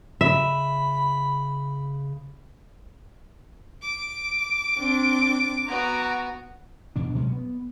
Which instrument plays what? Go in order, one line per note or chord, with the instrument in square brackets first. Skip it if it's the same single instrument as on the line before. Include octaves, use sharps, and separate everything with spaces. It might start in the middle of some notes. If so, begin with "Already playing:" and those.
[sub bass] C#3 [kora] E5 [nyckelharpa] B5
[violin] D6
[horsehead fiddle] C4 D4
[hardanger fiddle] B3 F#4 [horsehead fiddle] A#5
[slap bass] E2 B2 D4
B2 F#3 G#3 C#4
B3